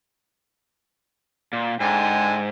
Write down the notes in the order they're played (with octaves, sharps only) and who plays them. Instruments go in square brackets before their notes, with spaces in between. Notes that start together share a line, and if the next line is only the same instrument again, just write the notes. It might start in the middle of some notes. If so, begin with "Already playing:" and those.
[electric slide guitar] A#2
[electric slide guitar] G#2 [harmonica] D3 G5 G#5